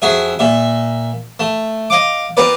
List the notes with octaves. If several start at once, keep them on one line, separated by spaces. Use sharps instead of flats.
F2 F#4 G#4 E5
A#2 E5
A3
D#5 F5 D6
C4 F4 A#4 B4 D5